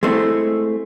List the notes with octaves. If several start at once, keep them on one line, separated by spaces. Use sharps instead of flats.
G#3 A3 C4 E4